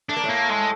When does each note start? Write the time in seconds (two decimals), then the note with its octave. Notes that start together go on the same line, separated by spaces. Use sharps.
0.09 A3 D4
0.17 A#3
0.24 A2 A3
0.29 A#3
0.50 G#3